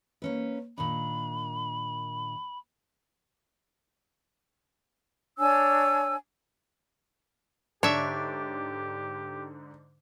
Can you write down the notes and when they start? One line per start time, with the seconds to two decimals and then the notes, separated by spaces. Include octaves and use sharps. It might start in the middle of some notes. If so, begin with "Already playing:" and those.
0.22 A#3 C#4 B4
0.78 A#2 D#3 D4 B5
5.39 D4 C#5 G#5 E6
7.83 G#2 D3 D4 G4 C#5 E5